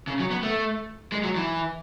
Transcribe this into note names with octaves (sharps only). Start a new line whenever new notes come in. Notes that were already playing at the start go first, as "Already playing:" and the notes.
C#3
F#3
B3
A3
G#3
F#3
E3